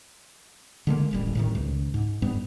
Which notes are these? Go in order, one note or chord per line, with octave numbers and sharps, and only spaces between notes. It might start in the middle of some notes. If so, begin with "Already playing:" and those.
D3 G#3 A#3
D#1 A1 G3
A2 C3 D#3
C#2
G#2
G2 G3 B3